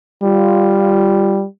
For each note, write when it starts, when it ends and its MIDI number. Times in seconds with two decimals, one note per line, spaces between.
0.23 1.45 55
0.23 1.41 65